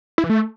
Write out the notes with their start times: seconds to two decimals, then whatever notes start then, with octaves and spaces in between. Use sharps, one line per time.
0.18 E4
0.24 E3
0.30 A3